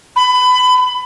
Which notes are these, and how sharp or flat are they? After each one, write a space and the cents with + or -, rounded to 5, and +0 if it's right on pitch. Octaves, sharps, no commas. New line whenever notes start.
B5 +20